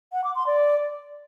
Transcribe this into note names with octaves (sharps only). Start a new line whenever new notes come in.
F#5
D6
C6
D5